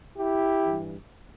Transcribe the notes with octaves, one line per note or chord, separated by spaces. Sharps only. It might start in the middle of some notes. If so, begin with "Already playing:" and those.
E4 G4
G2 E3